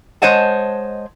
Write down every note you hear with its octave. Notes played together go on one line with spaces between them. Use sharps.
G#3 C5 C#5 D#5 F#5 A5